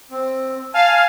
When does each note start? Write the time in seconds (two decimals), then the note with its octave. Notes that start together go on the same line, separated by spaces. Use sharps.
0.11 C4
0.74 F5 G#5 A5